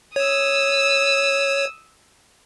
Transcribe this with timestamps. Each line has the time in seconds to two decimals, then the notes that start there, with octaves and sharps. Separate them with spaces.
0.16 C#5 D#6 E6